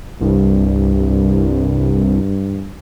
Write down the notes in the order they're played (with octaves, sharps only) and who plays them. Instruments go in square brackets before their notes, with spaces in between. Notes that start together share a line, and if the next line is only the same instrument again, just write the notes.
[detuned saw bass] C2 [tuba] G2